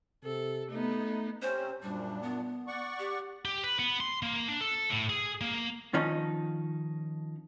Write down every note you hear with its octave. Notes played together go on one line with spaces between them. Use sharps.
C3 A4
A3 B3 D#4
C3 C4 C#4 C5
F#2 A#2 G3 D4
B3
D5 F#5 C#6
G4
G4
B4
B3
C6
A#3
D4
A4
A2
G#4
A#3
D#3 F3 C#4 D#4